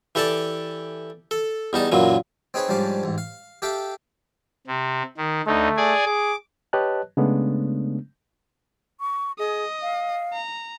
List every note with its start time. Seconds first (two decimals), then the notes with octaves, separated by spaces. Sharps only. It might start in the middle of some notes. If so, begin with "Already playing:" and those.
0.15 E3 G4 A4 D5 A5
1.31 A4
1.73 E2 G3 D#4 A5
1.92 F#2 A#2 E3 F#3
2.54 C4 D#4 G#4 B4 C#5
2.68 G#2 F3 G3 C#4 D4 F5
3.03 A1 G#2
3.18 F5
3.62 G4 A4 E5 F5 G5
4.67 C3
5.17 D#3
5.47 D2 A3 D#4
5.77 G#4 D5 G#5
6.06 G#4 D6
6.73 G4 B4 C#5 D#5 A5 F#6
7.17 C#3 G#3 A3 B3 C#4 D4
9.00 C#6
9.39 G#4 D#5
9.82 F5
10.33 A#5